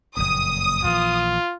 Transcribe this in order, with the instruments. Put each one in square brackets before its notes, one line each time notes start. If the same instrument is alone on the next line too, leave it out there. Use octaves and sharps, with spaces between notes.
[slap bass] F#1 F2 A#2 [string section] D#6
[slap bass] A#1 E3 [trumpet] F4